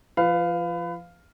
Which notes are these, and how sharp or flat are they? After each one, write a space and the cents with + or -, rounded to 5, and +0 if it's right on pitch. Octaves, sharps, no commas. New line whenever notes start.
F3 -25 B4 +25 F5 +0